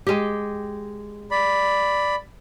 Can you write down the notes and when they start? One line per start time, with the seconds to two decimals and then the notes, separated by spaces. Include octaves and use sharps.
0.07 G#3 G4
1.31 D5 B5